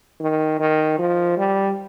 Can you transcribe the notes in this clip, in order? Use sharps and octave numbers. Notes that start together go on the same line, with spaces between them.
D#3
D#3
F3
G3